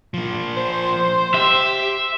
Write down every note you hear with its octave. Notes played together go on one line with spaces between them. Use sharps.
F3 A#3
C5
G4 E5